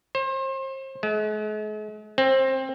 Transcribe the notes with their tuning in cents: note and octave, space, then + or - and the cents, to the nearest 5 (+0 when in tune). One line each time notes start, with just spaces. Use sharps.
C5 +35
G#3 +45
C4 +20